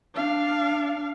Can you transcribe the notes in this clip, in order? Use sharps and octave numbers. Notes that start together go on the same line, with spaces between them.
D4 F5